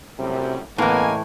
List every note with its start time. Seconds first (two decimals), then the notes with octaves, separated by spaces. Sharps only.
0.19 F#2 A2 C3 G3
0.78 A2 C#3 E3 A#3 B3 D#5 G#5